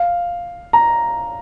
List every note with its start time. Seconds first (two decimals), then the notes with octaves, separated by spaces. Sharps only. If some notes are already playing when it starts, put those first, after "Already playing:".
Already playing: F5
0.73 A#5